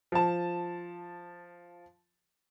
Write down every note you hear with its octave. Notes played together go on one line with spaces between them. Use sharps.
F3 A5